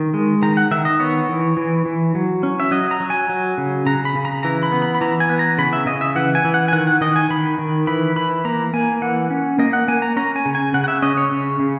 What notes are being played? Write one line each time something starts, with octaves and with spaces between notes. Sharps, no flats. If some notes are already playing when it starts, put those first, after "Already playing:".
Already playing: D#3
G#3
D#3 A#5
F#5
D#3 E5
D#5
B3 C#5
E3
E3
E3
F#3
C#4
E5
F#3 D#5
A#5
F#3
G#5
F#3
C#3
C#3 A#5
B5
C#3
A#5
E3 A#5
B5
B3
B5
B5
E3 A#5
G#5
B3
A#5
C#3 B5
E5
C#3 D#5
E5
E3 F#5
G#5
E3
F#5
G#5
D#3 F#5
F#5
D#3 D#5
G#5
D#3 B5
D#3
E3 B5
E3 B5
A#3 A#5
A#3 G#5
E3 F#5
C#4
A#3 D#5
F#5
A#3 G#5
A#5
C#4 A#5
G#5
C#3
G#5
C#3 F#5
F#5
E5
C#4 D#5
C#5
C#3
C#3